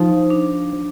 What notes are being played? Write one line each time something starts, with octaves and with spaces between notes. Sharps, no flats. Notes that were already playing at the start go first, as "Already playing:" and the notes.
Already playing: F3 D#4
D4